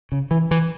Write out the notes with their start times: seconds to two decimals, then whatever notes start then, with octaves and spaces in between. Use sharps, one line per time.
0.12 C#3
0.31 E3
0.51 E3